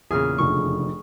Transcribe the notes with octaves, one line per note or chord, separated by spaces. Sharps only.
E2 A#2 C#3 G#4 F6
F1 D3 F3 C#6